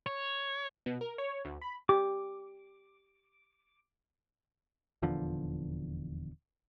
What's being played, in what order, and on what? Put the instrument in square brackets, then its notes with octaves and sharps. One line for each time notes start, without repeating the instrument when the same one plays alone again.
[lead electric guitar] C#5
[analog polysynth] B2
A#4
C#5
D2
B5
[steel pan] G4 [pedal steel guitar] D6
[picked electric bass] D#1 E2 D3 F3